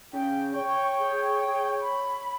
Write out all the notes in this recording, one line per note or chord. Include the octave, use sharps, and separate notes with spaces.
C#3 G5
C#5 G5 C#6
G#4
G#4
B5